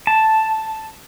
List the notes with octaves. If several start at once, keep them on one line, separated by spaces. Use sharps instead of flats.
A5